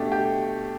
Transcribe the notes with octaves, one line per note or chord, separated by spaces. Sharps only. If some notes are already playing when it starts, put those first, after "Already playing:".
Already playing: B2 A3 D4 G4
G4